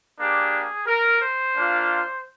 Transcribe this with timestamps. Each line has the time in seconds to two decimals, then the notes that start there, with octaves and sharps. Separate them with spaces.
0.19 A#3 D4 G4 G#4
0.87 A#4
1.22 C5
1.55 A#3 D4 F4